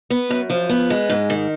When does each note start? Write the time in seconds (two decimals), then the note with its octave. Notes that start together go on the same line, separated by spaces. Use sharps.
0.10 B3
0.30 F#2
0.50 F3
0.69 B3
0.90 G#3
1.10 G#2
1.30 D#3